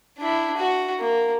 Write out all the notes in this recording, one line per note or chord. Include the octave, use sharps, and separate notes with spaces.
D4 E4
F#4
A#3